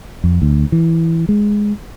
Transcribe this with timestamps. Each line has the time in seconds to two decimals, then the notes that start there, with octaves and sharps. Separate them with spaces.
0.24 F2
0.42 D2
0.72 E3
1.29 G#3